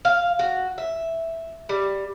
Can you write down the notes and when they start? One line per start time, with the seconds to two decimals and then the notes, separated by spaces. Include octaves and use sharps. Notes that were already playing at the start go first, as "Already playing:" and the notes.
0.05 F5
0.39 F#4
0.78 E5
1.69 G3